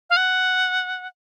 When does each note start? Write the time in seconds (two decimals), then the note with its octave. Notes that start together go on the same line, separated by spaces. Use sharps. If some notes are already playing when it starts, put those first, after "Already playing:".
0.10 F5
0.17 F#5